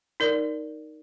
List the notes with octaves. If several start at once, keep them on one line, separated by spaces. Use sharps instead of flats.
D#4 A#4 D5